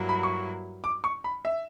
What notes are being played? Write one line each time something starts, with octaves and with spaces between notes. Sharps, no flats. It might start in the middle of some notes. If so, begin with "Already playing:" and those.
Already playing: G2 F#3 A#3 E4
B5
C#6
D6
C#6
B5
E5